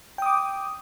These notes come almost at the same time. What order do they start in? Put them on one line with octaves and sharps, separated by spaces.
G5 D#6 D6